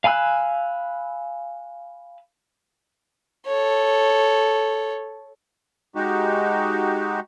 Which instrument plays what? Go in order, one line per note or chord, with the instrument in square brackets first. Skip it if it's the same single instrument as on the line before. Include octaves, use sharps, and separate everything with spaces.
[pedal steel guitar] F5 G#5 B5 E6 F#6
[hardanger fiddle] A4 C#5
[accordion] G#3 D#4 F#4 G4